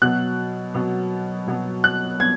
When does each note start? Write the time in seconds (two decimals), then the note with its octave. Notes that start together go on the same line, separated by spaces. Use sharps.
0.02 B2 F#3 B3 F#6
0.74 B2 F#3 B3
1.48 B2 F#3 B3
1.84 F#6
2.20 B3 G#6